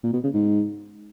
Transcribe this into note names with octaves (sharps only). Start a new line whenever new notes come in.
A#2
B2
C#3
G#2